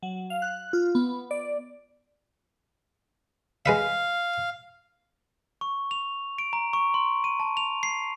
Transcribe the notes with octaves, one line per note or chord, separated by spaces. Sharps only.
F#3
F5
F#6
F4
B3
D5
G#3 B4 E5 F5
C#6
F7
D7
A#5
C#6
C6
D#7
A5
F7
C7